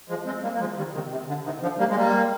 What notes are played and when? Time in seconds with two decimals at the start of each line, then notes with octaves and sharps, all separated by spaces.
0.09 F3 G#3
0.26 G#3 C4
0.43 G3 A#3
0.53 A#3
0.60 F3 G#3
0.77 D#3 G3
0.94 C3 D#3
1.11 C3
1.28 D3
1.45 C3 D#3
1.62 D3 F3
1.79 G3 A#3
1.89 G#3
1.96 G3 A#3